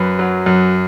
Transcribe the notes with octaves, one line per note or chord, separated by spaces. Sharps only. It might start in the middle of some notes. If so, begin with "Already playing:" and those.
Already playing: F#2 B4
F#3
F#2